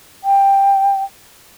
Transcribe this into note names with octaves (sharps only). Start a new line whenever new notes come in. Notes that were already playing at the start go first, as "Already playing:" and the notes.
G5